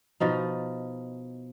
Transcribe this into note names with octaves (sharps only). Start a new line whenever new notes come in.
B2 F3 D#4